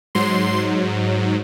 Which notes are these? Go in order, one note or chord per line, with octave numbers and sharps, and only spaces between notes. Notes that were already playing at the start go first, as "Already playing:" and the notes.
G#2 F#3 C6